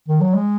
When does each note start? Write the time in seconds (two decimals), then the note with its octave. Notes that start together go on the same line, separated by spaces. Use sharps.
0.08 D#3
0.21 F#3
0.34 G#3